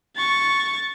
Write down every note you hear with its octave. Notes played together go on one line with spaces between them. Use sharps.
C#6 A6